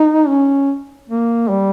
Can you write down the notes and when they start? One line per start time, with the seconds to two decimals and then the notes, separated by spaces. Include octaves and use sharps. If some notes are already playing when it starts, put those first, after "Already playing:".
Already playing: D#4
0.28 C#4
1.10 A#3
1.50 G3